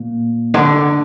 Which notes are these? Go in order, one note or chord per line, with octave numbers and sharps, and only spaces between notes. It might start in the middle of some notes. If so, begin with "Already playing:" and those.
Already playing: A#2
D3